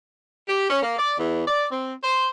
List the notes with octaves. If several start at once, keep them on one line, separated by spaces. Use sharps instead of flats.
G4
C#4
A#3
D5
E2
D5
C4
C5